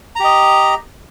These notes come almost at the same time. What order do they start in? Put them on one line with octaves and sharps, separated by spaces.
A#5 G4 D#5